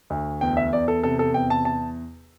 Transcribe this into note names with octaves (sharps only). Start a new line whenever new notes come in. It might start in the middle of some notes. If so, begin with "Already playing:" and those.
D2
E2 G5
E5
E2 D5
A4
C3 A4
A4
E2 G5
A5
A5